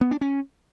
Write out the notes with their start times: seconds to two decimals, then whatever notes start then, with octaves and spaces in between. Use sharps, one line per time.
0.01 B3
0.11 D4
0.21 C#4